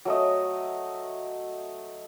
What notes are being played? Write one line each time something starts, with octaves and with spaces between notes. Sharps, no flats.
F#3 A3 D#5